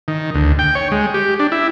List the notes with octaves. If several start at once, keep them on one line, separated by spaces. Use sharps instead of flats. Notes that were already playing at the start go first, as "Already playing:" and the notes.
D#3
D2
G5
C#5
G#3
G4
D4
E4